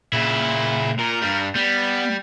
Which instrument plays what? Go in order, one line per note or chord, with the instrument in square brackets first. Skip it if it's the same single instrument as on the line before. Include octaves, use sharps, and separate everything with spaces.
[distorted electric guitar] A#2 [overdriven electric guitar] C#3 E4
[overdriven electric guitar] A#2 [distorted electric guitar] A#4
[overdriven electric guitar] G2 G3
[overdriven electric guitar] G3 [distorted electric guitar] B3